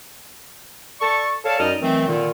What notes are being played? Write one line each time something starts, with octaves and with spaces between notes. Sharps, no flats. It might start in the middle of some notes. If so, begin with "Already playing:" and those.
A4 D5 A5 C#6
A4 C#5 D5 F5 A5
F#2 D#4 D5 D#5 D#6 F6
D#3 E3 F#3 A3 C4
A#2 D3 D#3